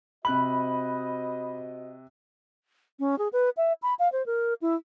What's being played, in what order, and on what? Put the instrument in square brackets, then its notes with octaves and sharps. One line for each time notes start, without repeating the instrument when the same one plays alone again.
[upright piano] C3 F#6 F#7 [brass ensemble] F#4 C5 D#5 [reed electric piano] B5
[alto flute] C#4
G#4
B4
E5
B5
F5
C5
A#4
E4